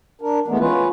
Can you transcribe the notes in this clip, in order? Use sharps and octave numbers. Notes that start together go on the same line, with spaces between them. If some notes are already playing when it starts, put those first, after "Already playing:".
D4 A#4
E3 G#3 A3 B3
C#4 F4 B4